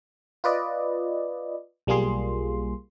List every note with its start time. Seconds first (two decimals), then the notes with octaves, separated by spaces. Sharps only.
0.44 F4 B4 D5 D#5
1.87 B1 G3 A#3 F4 G#4 C6